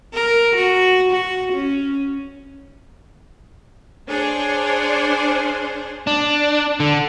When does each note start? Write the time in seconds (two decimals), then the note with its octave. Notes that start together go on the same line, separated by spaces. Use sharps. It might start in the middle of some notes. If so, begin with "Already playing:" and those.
0.14 A#4
0.55 F#4
1.11 F#4
1.52 C#4
4.08 D4 G#4 C5 C#5
6.07 D4
6.80 D3